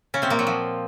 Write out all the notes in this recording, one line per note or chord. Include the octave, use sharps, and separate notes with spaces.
C#3 C#4
C3 C4
A#2 A#3
F#3
F3